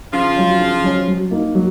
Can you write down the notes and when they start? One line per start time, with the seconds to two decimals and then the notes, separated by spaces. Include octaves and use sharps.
0.12 C#3 F3 F4
0.37 F#3 C#4
0.60 C#3
0.83 F#3 C#4
1.07 F#3
1.31 A#3 D#4
1.55 F#3